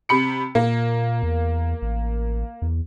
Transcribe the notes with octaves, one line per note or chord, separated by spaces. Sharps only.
C3 B5 C#7
A#2 A#3
E2
A1
E2